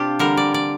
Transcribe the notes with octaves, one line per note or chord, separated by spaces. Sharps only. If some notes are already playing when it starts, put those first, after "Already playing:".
Already playing: C3 C4 D4 F4 G4
D3 G3 A#4
D5
D5